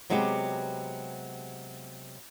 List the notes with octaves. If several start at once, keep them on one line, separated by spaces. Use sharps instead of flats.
C3 F#3 G#3 B3 F#4 G4